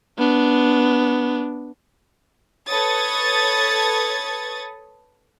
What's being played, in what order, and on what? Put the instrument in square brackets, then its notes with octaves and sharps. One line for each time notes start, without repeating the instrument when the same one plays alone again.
[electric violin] B3 D4
[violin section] A4 B4 C#5 D#6 G#6 A6